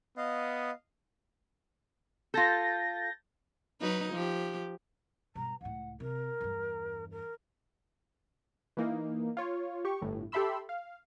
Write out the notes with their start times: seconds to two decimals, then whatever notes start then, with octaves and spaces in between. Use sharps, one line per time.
0.17 B3 D#5 F5
2.34 F4 A4 G6 A6 A#6
3.81 F#3 D#4 B4
4.13 F3 G4
5.35 G2 B2 A#5
5.61 C#2 A2 F#5
6.00 C3 A#4
6.41 E2 G2
7.11 A#4
8.77 E3 A#3 D#4
9.37 F4 C#5
9.85 G4 C#6
10.02 G1 A2
10.32 G4 A4 E5 B5 C6 E6
10.69 F5